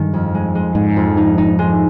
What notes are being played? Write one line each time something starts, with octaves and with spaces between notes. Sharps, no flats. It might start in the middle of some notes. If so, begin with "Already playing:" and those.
Already playing: G2 D#3 G#3
F2
G#3
G#3
G#2 G#3
F2
D#4
D#4
G#3